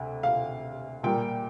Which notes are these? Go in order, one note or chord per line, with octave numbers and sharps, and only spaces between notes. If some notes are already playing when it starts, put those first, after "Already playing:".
Already playing: D2 C3
F5
A#2 G3 A#3 G5